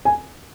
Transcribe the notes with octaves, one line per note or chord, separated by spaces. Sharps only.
G#5